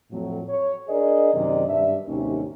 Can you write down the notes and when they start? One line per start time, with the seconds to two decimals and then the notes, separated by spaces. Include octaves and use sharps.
0.11 F2 A2 F#3
0.48 C#5
0.89 D4 G#4 A#4 D5 D#5
1.34 F#2 C3 D#3 A#4 D5 D#5
1.68 G2 D4 E5
2.07 D#2 A2 C3 D#3 F#3 C#4